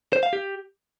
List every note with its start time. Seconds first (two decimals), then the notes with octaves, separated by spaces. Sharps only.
0.13 C5
0.23 F5
0.33 G4